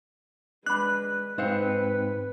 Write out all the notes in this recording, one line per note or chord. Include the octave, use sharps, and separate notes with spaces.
G#3 D4 B4 B5 F#6
G#2 C4 D#4 B4 C5 F5 C#7